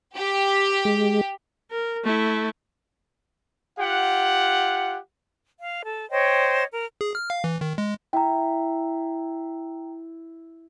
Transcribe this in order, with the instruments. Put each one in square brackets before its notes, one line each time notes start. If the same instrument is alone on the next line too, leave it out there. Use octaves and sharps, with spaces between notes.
[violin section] G4
[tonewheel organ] G#3
[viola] A#4
A3 E4
[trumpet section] F4 G4 F#5
[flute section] F5
A4
C5 C#5 D#5 G5
A#4
[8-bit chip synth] G#4
F6
F5
E3
D#3
G#3
[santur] E4 [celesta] G5 A#5